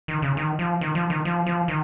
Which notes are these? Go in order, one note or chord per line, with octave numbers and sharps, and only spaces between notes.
D#3
C#3
D#3
F3
D#3
F3
D#3
F3
F3
D#3